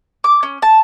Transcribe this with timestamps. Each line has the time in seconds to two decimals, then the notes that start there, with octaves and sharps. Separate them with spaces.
0.24 D6
0.43 C#4
0.62 A5